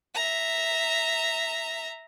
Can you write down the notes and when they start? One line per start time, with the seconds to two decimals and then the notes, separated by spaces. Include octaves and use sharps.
0.14 E5 A#5